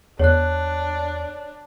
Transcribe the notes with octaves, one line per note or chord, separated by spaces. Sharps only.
E2 D4 C#5 F#6